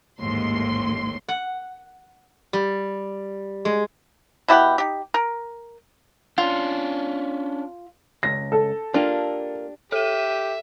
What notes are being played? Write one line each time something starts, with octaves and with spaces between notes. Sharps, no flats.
A1 D#2 G#2 C6
F#5
G3
G#3
B2 E4 G4 F#5
D#4 G4
A#4
C#4 D4 F4
C#2 A#6
A4
A#3 D4 F4 G4
G4 A4 E5 D#7